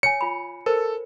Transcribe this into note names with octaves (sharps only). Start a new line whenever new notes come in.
C#5 G#5 C#7
F4 B5
A4 A#4 C5